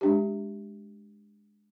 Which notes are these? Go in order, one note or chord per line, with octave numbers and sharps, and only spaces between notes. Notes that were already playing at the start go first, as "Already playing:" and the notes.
G#3 D4 G4